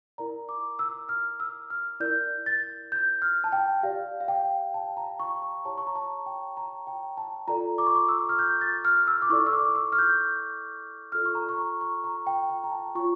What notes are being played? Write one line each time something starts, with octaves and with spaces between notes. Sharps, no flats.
E4 A#4 D5 A#5
D6
E6
F6
E6
F6
E4 A#4 D5 G6
A6
G6
F6
A5
G5
G4 D5 F5
F5
G5
A5
A#5
C#6
A#5
E4 G4 C#5 A5
C#6
A#5
A5
G5
A#5
G5
A5
F4 A4 D5 A#5
D6
C#6
D6
E6
F6
G6
A6
F6
E6
D6
E4 A4 D5 C#6
E6
D6
E6
F6
G6
F4 A4 D5 F6
C#6
A#5
C#6
A#5
C#6
A#5
G5
G5
A#5
A5
F4 C#5 C#6